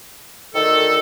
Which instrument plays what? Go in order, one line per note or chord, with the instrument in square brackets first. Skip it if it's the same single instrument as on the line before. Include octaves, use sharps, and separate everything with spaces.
[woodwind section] D2 D#3 [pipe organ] A4